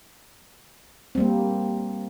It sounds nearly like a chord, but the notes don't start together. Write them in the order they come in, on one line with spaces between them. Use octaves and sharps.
C4 G3 A#3